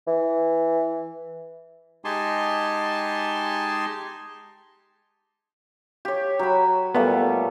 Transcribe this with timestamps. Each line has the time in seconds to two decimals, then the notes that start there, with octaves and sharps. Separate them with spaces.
0.08 E3
2.05 G#3 D#4 G4 G#5 A5 C6
6.05 G4 C#5
6.39 F#3 B5
6.95 A#2 G3 A3 B3